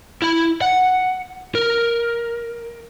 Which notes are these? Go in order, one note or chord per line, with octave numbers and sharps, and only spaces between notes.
E4 B5
F#5
A#4